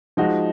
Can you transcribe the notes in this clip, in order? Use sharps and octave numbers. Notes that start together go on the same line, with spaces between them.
F3 G#3 D#4 F#4